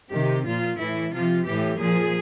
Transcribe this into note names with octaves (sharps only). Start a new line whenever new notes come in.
C3 D#3 G4
A#2 F3 F4
A2 E3 E4
C3 F3 F4
A2 E3 G4
A#2 F3 G#4